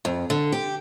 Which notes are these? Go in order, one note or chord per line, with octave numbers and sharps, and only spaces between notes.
F2
D3
G4